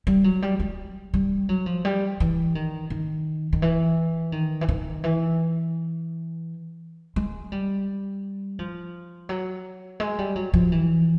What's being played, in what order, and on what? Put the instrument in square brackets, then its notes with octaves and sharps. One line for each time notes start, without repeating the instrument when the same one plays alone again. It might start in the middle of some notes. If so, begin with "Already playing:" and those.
[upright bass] G3
F#3
G3
G#3
G3
F#3
F3
G3
E3
D#3
D#3
D#3
E3
D#3
E3
D#3
E3
G#3
G3
F3
F#3
G#3
G3
F#3
F3
E3